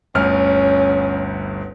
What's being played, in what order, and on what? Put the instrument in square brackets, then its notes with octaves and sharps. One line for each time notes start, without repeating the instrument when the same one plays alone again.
[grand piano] G1 D2 F6 [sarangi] C#4